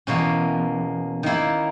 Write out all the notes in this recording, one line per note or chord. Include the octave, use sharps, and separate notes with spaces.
E2 B2 A#3 C#4
D#3 A#3 E4